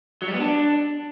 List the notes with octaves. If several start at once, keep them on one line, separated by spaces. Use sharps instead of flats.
F#3
G3
B3
D4